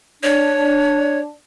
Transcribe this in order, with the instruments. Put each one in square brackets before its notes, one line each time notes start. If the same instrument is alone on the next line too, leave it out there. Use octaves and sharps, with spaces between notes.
[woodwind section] D4 [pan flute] C#5